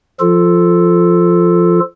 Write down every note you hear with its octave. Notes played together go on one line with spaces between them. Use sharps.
F3 F4 A4